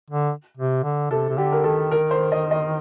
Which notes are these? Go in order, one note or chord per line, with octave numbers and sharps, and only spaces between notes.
D3
C3
D3
C3 A4
C3
D3 G4
A#4
D#3 A4
A#4
C5
D#5
D#5